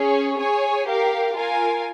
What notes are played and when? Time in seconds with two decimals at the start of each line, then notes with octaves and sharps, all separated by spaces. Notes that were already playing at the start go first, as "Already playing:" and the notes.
Already playing: C#4 G#4 C#5
0.38 G#4 C#5 G#5
0.86 G4 A#4 F5
1.34 F4 A#4 F5 G#5